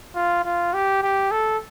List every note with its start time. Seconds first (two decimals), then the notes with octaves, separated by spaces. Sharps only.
0.16 F4
0.44 F4
0.74 G4
1.03 G4
1.32 A4